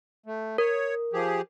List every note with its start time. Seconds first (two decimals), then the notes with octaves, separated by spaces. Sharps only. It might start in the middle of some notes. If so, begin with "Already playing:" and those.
0.26 A3
0.58 A#4 C#5
1.13 F3 G4 G#4